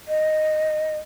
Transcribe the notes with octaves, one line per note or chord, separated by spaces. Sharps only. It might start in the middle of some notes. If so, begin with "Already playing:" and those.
D#5